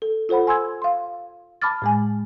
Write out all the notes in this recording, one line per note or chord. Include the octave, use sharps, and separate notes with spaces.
A4
F4 A4 C5 F#5 B5
G#5 C6 E6 G#6
F5 C6
A5 B5 D6 F6 A6
A2 G#3 G#5